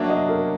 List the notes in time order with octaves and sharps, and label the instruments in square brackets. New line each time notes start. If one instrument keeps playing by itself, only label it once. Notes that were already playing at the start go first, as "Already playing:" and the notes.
Already playing: [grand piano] F#3 A#3 D4 [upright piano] E5
[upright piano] D#5
A#4